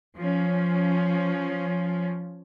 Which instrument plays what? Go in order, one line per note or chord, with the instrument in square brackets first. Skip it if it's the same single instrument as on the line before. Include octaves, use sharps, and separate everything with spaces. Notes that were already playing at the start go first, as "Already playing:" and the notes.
[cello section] F3 C#4